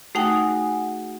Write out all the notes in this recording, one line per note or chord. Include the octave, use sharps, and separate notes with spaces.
A3 D#4 F#4 G#4 G5